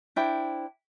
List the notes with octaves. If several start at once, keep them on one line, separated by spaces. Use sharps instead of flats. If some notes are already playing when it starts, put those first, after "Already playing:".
D4 E4 C5 G5